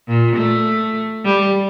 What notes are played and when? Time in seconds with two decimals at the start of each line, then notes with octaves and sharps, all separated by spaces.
0.08 A#2
0.36 A3
1.25 G3